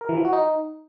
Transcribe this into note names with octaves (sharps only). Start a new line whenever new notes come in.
A#4
E3
F3
F#4
D#4